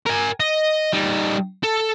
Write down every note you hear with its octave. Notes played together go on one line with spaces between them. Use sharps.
A#4 G#5
D#5
G3 D#4
A4